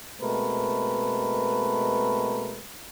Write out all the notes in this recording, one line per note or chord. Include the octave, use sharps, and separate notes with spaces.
B2 G#3 A3 C4 A#4 B4